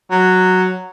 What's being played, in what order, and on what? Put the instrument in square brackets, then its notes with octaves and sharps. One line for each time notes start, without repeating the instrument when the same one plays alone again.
[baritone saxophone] F#3